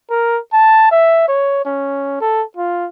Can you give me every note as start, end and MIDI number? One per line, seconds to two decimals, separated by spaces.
0.10 0.39 70
0.53 0.90 81
0.91 1.25 76
1.28 1.62 73
1.65 2.17 61
2.21 2.44 69
2.57 2.88 65